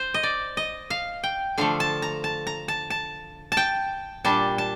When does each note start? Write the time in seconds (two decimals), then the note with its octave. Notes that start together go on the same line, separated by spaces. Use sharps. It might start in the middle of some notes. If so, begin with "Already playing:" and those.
Already playing: C5
0.14 D#5
0.23 D5
0.57 D#5
0.90 F5
1.23 G5
1.58 D3 F3 A3 F5
1.80 A5
2.02 A#5
2.24 A5
2.47 A#5
2.68 A5
2.90 A5
3.52 A5
3.57 G5
4.24 A#2 G3 D4 A5
4.58 A5